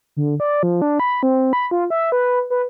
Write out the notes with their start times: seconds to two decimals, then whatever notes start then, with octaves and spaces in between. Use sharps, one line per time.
0.17 D3
0.40 D5
0.63 F3
0.82 D4
0.99 B5
1.23 C4
1.53 B5
1.71 F4
1.90 E5
2.12 B4
2.50 B4